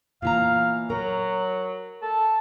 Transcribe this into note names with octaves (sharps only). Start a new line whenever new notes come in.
A#2 E3 F5 A#5
F#3 A#4
A4